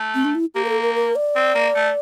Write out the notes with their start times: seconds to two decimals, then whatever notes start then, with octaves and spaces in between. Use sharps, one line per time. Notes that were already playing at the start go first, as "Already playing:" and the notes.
Already playing: A3
0.15 C4
0.25 D4
0.35 E4
0.55 A#3 G4
0.65 A#4
0.69 A4
0.82 A#4
0.95 A#4
1.16 D5
1.36 C4
1.55 A#3
1.75 A3